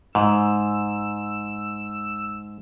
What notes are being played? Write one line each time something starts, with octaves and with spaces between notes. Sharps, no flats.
G#2 E6